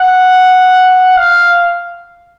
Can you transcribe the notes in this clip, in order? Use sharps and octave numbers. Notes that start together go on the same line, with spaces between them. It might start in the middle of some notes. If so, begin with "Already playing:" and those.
Already playing: F#5
F5